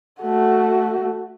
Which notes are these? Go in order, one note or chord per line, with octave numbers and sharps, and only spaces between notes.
A3 F#4